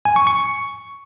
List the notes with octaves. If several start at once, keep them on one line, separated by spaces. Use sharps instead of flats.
G#5
C#6
C#6